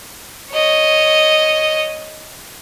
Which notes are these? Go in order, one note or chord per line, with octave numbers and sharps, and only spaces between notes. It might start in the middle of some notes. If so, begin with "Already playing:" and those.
C#5 D#5